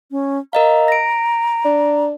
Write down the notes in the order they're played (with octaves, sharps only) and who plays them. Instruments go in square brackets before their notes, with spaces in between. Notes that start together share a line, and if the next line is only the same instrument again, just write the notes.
[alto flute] C#4
[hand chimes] A#4 D#5 F5 [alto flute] A#5
[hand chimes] A#6 D7
[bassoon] D4